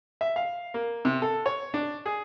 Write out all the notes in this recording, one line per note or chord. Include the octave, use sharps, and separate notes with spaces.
E5
F5
A#3
C3
A4
C#5
D4
G#4